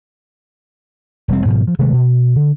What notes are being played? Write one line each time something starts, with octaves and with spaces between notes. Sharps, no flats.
E1 G3 C4
G#2 B2 E3 F3
F3
C3 D#3 G#3 A3
B2
D3